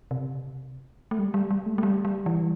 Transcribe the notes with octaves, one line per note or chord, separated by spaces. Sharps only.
C3
A3
G3
G3
G3
A3
A3
G3
G3
E3